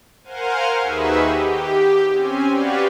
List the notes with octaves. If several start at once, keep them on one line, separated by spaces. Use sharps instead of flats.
A#4 C5 F5 F#5 G#5
D#2 D#4 F#4 G#4 B4 E5
G4
C4 C#4 G#5
F#4 G4 B4 C#5 D5 F5